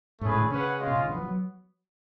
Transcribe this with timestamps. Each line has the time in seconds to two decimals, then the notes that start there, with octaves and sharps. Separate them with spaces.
0.21 G#2 A3 C#4 G#4 B4
0.31 A2
0.41 D3
0.50 C#3 C#4 G#4 B4 F#5
0.80 G#3 C#4 F4
0.87 B2
0.96 C#3
1.05 D3 B3
1.15 F3
1.23 F#3